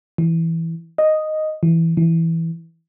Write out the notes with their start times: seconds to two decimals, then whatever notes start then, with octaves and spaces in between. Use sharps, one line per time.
0.18 E3
0.98 D#5
1.63 E3
1.97 E3